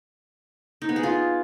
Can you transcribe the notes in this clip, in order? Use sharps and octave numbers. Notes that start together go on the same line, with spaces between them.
D#4
B3
G#4
F4